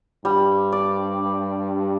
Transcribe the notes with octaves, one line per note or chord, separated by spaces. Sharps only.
G2 G3
D5